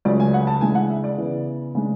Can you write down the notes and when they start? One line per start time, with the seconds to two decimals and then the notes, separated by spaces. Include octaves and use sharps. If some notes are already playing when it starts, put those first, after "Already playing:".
0.05 C#2 C#3 F#3 A3 C#4 D5
0.20 G#5
0.34 F#5
0.47 A5
0.61 C#3 E3 G#3 D4 G#5
0.75 F#5
0.90 E5
1.04 D5
1.18 C#3 E3 B3
1.75 C#3 G#3 D4